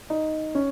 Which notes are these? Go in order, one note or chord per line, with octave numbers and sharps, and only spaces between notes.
D#4
C#4